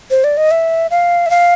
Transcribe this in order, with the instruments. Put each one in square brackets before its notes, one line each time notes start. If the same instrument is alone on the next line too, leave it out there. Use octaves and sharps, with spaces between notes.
[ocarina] C5
D5
D#5
E5
F5
E5
F5